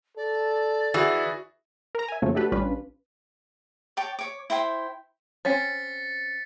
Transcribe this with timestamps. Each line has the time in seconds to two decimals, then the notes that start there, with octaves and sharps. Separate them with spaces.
0.17 A4 D5
0.94 E3 F#4 G#4
1.95 A#4 A#5
2.08 E5 G#5
2.22 F#2 C#3 F3 A3 A#3 C#4
2.35 A3 D4 F#4 G4 A4 B4
2.52 A1 G3 C#4 D4 F4 B4
3.97 C#5 G5 A5 D6
4.19 C#5 D6
4.50 E4 C5 G5 C6
5.45 C4 C#4 C#5 A6 B6 C#7